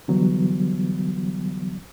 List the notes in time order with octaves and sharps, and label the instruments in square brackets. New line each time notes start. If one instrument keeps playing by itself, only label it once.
[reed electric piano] D3 E3 F#3 G3 B3